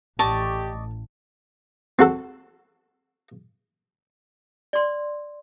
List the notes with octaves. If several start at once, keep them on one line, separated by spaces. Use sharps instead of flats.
A1 D#4 G4 D5 A5 C#6
C4 F#4 A4
D5 C6